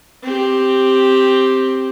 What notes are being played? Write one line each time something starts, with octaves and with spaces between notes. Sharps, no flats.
C4 G4